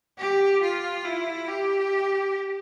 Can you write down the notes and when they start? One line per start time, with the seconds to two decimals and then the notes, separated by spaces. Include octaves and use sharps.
0.18 G4
0.61 F4
1.04 E4
1.48 G4